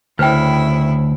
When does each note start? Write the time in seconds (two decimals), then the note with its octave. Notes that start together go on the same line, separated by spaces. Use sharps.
0.19 D2 C#3 E4 B4 C5 G5